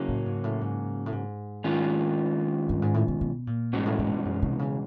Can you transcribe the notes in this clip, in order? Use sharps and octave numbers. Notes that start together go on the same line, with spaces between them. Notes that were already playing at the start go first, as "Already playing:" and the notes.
Already playing: C#3 F#3 A#3 C#4
A2
G#2
A2
G#2
A2
G#2
D#3 G#3 C#4 F4
G2
G#2
A2
B2
B2
A#2
E2 G#2 B2 G#3 C#4
A2
G#2
G2
F#2
C3
C#3